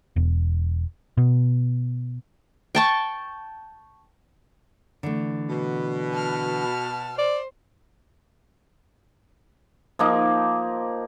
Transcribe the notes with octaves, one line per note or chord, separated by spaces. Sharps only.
E1
B2
G5 A5 C#6
D3 E3 A3
B2
A5 F6
C5 D5
F3 A#3 D#4